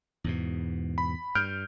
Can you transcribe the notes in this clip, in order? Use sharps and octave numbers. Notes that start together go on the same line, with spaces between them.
E2 G#2 B2
B5
G2 F6 G6 D7